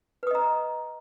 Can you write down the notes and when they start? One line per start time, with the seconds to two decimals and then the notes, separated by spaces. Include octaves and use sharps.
0.23 B4
0.27 D#6
0.31 D#5
0.35 A#5